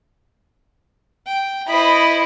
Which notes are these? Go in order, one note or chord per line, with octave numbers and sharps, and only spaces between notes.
G5
E4 C5 D#5 B5